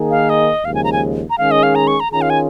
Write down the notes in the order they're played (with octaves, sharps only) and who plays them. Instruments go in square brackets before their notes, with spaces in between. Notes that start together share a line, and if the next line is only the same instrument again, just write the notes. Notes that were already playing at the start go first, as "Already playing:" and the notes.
Already playing: [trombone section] D#3 A#3 D#4 G#4
[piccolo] F5
D#5
[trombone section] D#2 C#3 F3 G#3 [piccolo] F5
[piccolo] G#5
A#5
G#5
A#5
[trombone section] D#3 G#3 C#4 G#4 [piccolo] F5
[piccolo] D#5
F5
A#5
C#6
A#5
[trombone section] D#3 C#4 F4 G#4 [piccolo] A#5
[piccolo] F5
G#5